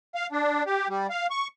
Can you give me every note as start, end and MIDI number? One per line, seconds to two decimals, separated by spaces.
0.15 0.27 77
0.32 0.63 62
0.66 0.88 67
0.88 1.07 55
1.10 1.27 77
1.30 1.47 85